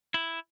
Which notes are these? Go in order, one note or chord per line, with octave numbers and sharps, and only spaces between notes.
E4